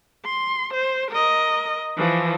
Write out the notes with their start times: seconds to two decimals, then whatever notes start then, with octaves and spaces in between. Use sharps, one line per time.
0.25 C6
0.74 C5
1.11 A#4 D#5
1.97 E3 F3